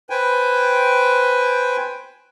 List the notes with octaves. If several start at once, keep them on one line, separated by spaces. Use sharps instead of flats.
B4 C5 G5 G#5